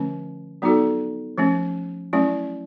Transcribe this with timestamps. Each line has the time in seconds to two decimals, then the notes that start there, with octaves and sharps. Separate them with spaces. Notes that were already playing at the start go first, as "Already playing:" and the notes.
Already playing: D3 F3 A3 C#4
0.62 F#3 B3 D#4 F#4 A4
1.38 F3 A3 C#4
2.13 F#3 A3 C#4 E4